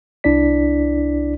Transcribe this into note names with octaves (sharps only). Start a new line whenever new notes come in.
C2 D4 E4 D5 B6